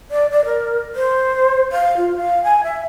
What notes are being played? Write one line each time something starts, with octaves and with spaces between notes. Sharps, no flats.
D5
D5
A#4
C5
F5
F4
F5
G#5
E5